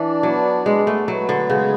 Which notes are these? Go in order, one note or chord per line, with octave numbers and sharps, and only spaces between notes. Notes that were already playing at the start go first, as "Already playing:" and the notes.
Already playing: E3 D4
F#3 B3
G#3 B3
A3
F#3 B3
D3
C#3 G#3